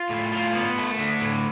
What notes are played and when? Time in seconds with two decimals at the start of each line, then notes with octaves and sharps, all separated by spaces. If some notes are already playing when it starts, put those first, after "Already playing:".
Already playing: F4
0.09 A2
0.32 F4
0.55 B3
0.77 A3
0.99 D3
1.21 A2